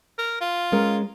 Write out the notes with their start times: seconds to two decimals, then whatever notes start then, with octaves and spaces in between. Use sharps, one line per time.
0.18 A#4
0.41 F4
0.72 G#3 C#4 A#4